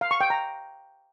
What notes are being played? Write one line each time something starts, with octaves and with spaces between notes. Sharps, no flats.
F5
C#6
G5
A#5